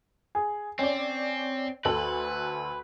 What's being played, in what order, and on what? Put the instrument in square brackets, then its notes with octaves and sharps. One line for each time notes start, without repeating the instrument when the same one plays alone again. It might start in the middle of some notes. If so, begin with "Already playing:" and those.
[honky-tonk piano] G#4
[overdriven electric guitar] C4 [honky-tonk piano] C#4 D5
[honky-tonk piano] D2 A4 F#7 [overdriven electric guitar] B4